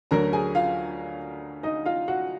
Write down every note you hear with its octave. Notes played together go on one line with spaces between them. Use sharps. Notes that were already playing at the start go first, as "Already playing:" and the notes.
D2 D3 F#3 A#4 A#5
G#4 G#5
F4 F5
D#4 D#5
F4 F5
F#4 F#5